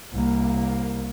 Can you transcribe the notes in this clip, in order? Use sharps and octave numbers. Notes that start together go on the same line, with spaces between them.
C2 A#3